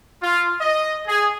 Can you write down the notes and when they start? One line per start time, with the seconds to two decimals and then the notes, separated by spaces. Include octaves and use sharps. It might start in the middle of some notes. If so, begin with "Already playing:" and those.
0.21 F4
0.60 D#5
1.07 G#4